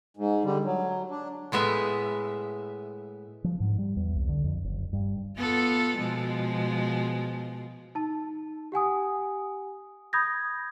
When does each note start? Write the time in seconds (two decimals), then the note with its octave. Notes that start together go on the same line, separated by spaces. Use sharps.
0.17 G#2
0.44 D3 G3
0.65 F#3
1.10 D4
1.52 A2 G#3 B3 E5
3.44 F3
3.60 G#2
3.78 G3
3.97 E2
4.16 C2
4.29 D3
4.44 F2
4.64 F#1
4.93 G2
5.38 B3 F4 A4
5.98 B2 F3 G#3
7.95 D#4 A5
8.72 G4 F#5 G#5 D#6
10.13 B5 D#6 G6 G#6 A#6